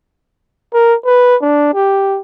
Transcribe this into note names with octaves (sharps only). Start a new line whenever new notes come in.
A#4
B4
D4
G4